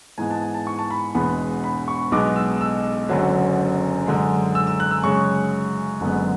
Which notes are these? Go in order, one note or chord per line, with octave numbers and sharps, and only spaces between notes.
G#2 E3 G#3 B3 G#5
A5
G#5
A5
C#6
A5
B5
E1 E2 B2 G#3 B3 B5
B5
C#6
B1 B2 G#3 B3 D6
E6
E6
F#1 F#2 D3 F#3 C#4
F#2 D3 G#3
E6
E6
F#6
E6
F#2 C#3 G#3 C#6
F#1 F#2 D3 G#3 B3